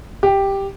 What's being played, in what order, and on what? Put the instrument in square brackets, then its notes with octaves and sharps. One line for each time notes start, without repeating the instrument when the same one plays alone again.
[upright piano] G4